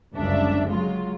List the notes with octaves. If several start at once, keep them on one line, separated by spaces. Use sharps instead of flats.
G1 C#2 F#2 D4 E5
F#3 G#3 F4